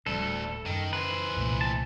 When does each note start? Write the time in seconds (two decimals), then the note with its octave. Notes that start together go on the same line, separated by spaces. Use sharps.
0.06 D1 D2 G3 D4 A4
0.66 F#2 D#3
0.93 E3 B4 C5
1.35 C2 A#2 A3
1.61 A5